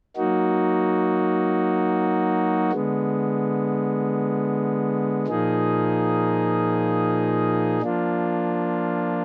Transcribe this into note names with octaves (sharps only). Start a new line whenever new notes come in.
F#3 A#3 D#4 F#4
D3 G#3 B3
A#2 F3 A#3 D#4 G#4
F3 A#3 D4 F4